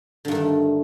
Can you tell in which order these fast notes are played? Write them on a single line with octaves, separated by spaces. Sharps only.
D3 G2 D#3 A3